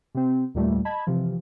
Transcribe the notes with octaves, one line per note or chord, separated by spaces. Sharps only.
C3 C4
D#2 A#2 G3 A3
D#5 A5 B5 G#6
C3 E3 F3